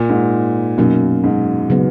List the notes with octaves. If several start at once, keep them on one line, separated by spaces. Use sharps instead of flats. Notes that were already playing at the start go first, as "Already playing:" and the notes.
Already playing: A#2
G#2
F#2 B2 F#3 A#3 D#4
G#2
C#3 F#3 B3